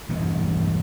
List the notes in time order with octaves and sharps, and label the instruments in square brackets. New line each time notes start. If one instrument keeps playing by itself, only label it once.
[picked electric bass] E1 E2 G2 B3